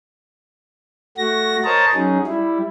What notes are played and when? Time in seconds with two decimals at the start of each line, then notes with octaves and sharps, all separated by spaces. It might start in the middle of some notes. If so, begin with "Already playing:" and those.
1.18 A3 F#4 A#6
1.64 A#4 C5 C#5 D#5 A5 A#5
1.94 F#3 C#4 D#4 G#4
2.27 G3 E4